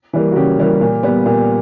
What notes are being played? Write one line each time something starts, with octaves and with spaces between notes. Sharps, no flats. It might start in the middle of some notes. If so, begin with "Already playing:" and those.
E3 G3 A#3
F#4
C#3 G4
E3 G3 A#3
A#2
G3 B3
A#2